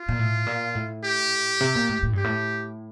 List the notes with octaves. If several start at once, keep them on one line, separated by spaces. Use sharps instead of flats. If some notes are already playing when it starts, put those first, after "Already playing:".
Already playing: F4
A#2
A2
A#2
A2
G4
C3
A#2
A2
A2
G2 G4
A2